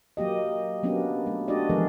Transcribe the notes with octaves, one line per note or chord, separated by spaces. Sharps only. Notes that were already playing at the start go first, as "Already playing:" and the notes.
F#3 A#3 G4 D#5
F#3 A#3 B3 C#4 D4 G4
A3
A3 D4 F#4 G4 D5 D#5
E3 F3 G#3 B3 G#4 A#4